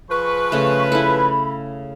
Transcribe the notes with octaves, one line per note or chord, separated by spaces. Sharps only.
F3 G#4 B4 C#6
C#3 A3
E4 A4 B5